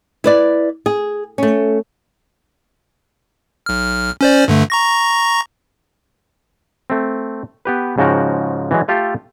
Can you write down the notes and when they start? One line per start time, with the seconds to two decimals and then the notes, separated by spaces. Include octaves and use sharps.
0.24 E4 B4 D5
0.86 G#4
1.38 A3 C#4
3.66 B1 F6
4.21 C#4 C5 D5
4.48 G2 D3 A3
4.70 A#5 C#6 A#6
6.90 A3 C4
7.65 B3 G4 B4
7.98 G#2 C#3 F3 F#4 G5 A#5
8.71 E3 F#3 G#3
8.88 A3 F4 G4 A4 F5